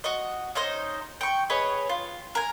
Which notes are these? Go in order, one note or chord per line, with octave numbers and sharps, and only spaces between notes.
F#4 D#5
C#4 D#4 C5 D#5
G5 C#6
G#4 B4 C#5 D#5
F4
A#4 G#5